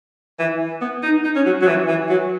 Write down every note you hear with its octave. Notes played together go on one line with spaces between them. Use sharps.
E3
B3
D#4
D#4
C#4
F#3
F#3
E3
E3
F#3